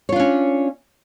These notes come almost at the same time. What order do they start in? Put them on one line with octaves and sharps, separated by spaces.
C#5 F4 D4 C#4